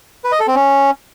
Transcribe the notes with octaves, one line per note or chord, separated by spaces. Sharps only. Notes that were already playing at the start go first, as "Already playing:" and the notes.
B4
D#5
A4
C4
C#4